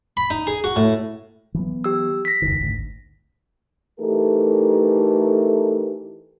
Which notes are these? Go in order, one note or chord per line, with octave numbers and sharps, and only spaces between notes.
B5
D#4
G#4
F#4
A2
E3 F#3 B3
G4 E6
A#6 B6
F1 C#2 D#3
G#1 D2
E3 A3 D#4 G4 A4 A#4